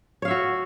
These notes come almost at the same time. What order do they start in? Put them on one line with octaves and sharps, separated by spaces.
C#5 F5 E5 F#4